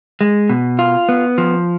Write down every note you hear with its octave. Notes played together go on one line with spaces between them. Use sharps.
G#3
B2
F4
B3
F3